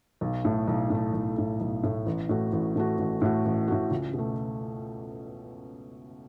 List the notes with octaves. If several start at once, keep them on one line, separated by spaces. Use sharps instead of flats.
B1
A2 A3
B1
A2 A3
B1
A2 A3
B1
A2 A3
A1
A2 A3 F#4
A1
A2 A3 F#4
A1
A2 A3 F#4
A1
A2 A3 F#4
C#2
B2
A3